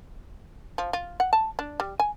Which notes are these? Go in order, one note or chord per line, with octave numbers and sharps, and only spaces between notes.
F3
F4
F#5
A5
D4
G3
G#5